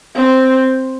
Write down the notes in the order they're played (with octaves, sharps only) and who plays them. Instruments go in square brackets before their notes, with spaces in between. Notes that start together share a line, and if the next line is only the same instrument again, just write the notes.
[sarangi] C4